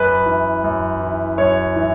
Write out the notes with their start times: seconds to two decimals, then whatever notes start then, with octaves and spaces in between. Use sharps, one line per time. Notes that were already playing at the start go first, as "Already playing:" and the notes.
Already playing: F#2 B4
0.26 E3
0.64 F#2
1.01 E3
1.38 F#2 C#5
1.76 E3